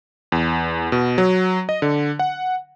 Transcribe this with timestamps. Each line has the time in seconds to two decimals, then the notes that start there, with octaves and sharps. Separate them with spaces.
0.32 E2
0.92 B2
1.18 F#3
1.69 D#5
1.82 D3
2.19 F#5